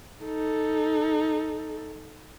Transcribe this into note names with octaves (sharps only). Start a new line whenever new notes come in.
D#4 A4